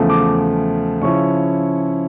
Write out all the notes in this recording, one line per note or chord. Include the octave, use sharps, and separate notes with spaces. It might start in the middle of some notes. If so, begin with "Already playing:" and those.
Already playing: E2 C#3 F3 A3
D6
C#3 F3 C#4 E4 C#6